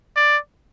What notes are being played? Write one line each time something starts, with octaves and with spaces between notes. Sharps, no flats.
D5